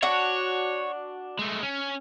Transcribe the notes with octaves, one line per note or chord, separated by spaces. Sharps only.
D4 F#4 C#5 F#5
G#3 A3
C#4